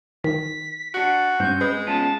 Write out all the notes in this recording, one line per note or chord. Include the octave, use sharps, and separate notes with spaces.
D#3 B6
D4 F#4 F#5
G2 C4 C#4 G6
G#3 B4
B3 C#4 F4 A5